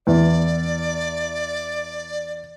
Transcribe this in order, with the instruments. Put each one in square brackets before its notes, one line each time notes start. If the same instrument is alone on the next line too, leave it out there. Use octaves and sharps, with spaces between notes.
[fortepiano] E2 [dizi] D5